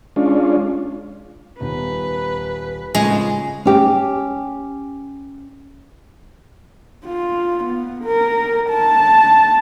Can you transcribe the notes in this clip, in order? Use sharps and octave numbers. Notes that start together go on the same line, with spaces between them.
G#3 C#4 D4 F4
D#1 B3 D#4 B4
A2 C#3 G#3 C4 F4
C#4 G4
F4
B3
A#4
A5